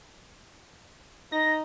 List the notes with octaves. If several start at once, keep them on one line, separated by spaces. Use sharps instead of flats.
D#4 A#6